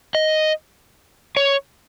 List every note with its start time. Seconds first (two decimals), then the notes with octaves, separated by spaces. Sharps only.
0.15 D#5
1.37 C#5